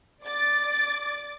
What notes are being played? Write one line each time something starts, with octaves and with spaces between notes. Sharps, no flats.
D5 D6 A6